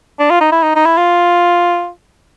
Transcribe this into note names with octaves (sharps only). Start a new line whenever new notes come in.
D4
F4
D#4
E4
D#4
D#4
E4
F4